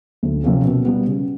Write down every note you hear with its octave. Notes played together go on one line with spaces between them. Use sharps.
D2
C3 F3 A#3 C#4
B2
G3 B3
C#3